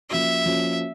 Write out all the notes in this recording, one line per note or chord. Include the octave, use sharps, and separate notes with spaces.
F3 A#3 C#4 F#4 E5
F3 A#3 C#4 F#4